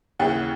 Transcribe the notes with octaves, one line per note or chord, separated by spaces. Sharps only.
D#2 C#3 E3 F#5